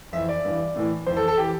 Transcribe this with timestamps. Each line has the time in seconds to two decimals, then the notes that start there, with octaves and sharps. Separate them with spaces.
0.13 F2 E3 E5
0.29 D5
0.45 G2 E3
0.76 A2 E3
1.06 F2 E3 C5
1.17 A4
1.28 A4
1.37 E3 G4